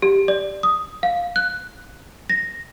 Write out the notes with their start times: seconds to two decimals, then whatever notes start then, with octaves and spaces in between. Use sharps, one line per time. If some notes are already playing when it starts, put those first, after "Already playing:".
0.02 G4
0.28 D5
0.63 D#6
1.03 F5
1.36 F#6
2.30 A#6